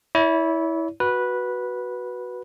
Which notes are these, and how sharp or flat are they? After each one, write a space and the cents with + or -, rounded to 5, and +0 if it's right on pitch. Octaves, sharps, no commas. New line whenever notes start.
E4 -15 C#5 +40
F#4 +0 B4 -10